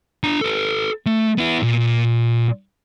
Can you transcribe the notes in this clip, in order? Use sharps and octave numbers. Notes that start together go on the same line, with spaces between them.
D4 A#5
A4 B4
A3
B3 E4
A#2